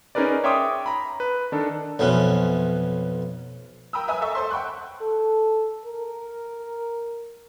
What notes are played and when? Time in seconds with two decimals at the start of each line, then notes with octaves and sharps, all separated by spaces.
0.15 C#4 D#4 G#4 A#4 B4 D5
0.44 C#5 E5 G5 C6 D6 D#6
0.86 A#5 B5
1.20 B4
1.52 D#3 D4 A4
1.99 B1 F2 E3 B3 C#4
3.93 A#4 G5 A#5 B5 D#6 E6
4.08 B4 E5 G#5 A#5 D#6 E6
4.22 A4 D#5 E5 C#6
4.35 A4 C5 C6
4.51 F#5 G5 B5 C#6 F#6
5.02 A4
5.86 A#4